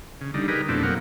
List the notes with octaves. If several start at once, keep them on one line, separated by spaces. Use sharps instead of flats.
C#3
D3 G3 D#4
D#4 G4 G#4 A#4 B4
F2 B2 A3 C4 D4 E4
F#3 A#3 C4 A#4 F5 F#5